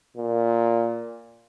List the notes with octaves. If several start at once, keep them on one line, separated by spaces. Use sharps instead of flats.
A#2